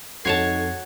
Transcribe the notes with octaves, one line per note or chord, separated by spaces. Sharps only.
F2 D#4 F#4 A4 C#5 A5 G#6 C7